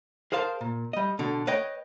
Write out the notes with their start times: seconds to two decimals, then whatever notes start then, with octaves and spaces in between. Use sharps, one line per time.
0.32 G#4 A#4 C5 F5 A5
0.61 A#2
0.93 G3 D#5
1.19 B2 D3
1.47 B4 C#5 D#5 G5